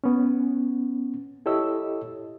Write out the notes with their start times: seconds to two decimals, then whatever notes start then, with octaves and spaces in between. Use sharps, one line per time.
0.04 B3 C#4
1.46 E4 G4 A4 C#5 D#5 E6